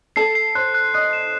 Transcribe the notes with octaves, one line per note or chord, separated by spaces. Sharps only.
A4 A5 C7
C7
C5 C6 F#6
F#6
D#5 D#6 F#6
E7